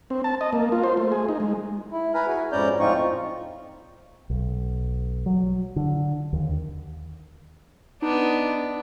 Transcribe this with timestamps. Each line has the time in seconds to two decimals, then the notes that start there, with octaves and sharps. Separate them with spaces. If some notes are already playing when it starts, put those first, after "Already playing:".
0.10 C4
0.24 A5
0.41 D#5
0.53 A#3
0.72 F4
0.83 C5
0.97 A3
1.12 G#4
1.29 D#4
1.40 G#3
1.92 E4
2.14 B4 G#5 A#5 B5 F6
2.27 E4 F#4 G#4 G#5
2.52 F2 G#2 C#4 D5 A#5 G6
2.80 F2 A2 C4 D#4 F4 C#6
4.30 B1
5.26 F#3
5.76 D3
6.33 D#2
8.02 B3 D4 D#4